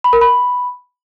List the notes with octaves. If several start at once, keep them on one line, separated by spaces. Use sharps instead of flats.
B5
A#4
B5